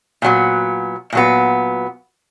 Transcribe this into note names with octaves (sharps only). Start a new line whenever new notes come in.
A#2 F#3 B3
A#2 F#3 B3